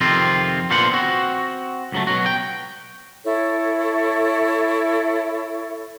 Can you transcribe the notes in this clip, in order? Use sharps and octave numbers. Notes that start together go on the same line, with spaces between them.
F2 C3 D#3 C4 F4
A#2 D3 B3 F4 C5 F#5
C4 F#4
C#2 F#3 A3
B2 F#3 F#4
G5
E4 A4 C#5